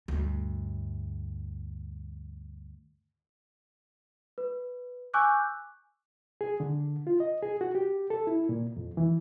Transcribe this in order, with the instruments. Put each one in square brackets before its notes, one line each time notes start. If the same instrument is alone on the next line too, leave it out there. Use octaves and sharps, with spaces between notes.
[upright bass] D2 G2
[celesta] B4
G#5 C#6 D6 E6 F#6 G6
[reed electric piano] G#4
D3
F4
D#5
G#4
F#4
G4
A4
E4
A#2
F2
E3